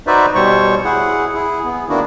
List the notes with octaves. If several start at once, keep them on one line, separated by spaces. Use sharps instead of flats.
D#4 F#4 B4 C5 D5 E5
B2 G3 C5 C#5 C#6
E4 G#4 F#5
E4 G#4
B3
D#3 A#3 B3 D4 E4 F#4